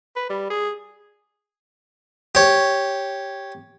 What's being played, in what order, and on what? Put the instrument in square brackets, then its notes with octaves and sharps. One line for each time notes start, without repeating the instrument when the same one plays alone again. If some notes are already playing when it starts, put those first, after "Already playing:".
[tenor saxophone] B4
G3
G#4
[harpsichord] G4 C#5